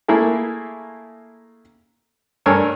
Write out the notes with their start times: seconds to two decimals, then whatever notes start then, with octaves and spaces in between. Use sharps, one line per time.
0.08 A3 A#3 E4 G#4
2.46 G2 A4 A#4 C#5 G#5 E6